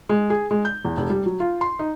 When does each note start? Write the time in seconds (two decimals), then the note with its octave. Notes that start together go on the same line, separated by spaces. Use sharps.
0.09 G#3
0.30 G#4
0.51 G#3
0.65 G6
0.85 E2
0.97 F1
1.10 G3
1.26 F#3
1.40 F4
1.61 C6
1.79 D#4